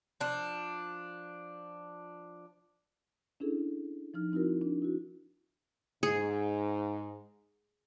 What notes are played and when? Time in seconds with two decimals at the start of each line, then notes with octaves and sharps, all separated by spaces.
0.20 F3 D4
3.40 C#4 D4 E4 G#4 A4
4.14 F3 D#4 F6
4.32 C4 D#4 E4 F#4 A#4
4.61 D4
4.82 E4 F#4
6.03 G#2 G#4